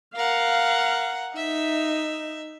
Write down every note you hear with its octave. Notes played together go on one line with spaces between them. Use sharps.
A#4 F5 F#5
D#4 E5